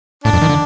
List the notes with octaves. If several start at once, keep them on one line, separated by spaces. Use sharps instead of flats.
A2 D4
F2
D#3
D3